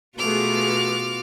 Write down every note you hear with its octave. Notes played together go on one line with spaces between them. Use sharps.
B2 A3 B3 F4 F#4 G#4 D6 F6